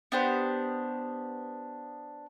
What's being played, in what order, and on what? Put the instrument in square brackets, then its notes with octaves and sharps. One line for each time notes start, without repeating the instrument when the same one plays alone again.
[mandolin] B3 D4 G4 C5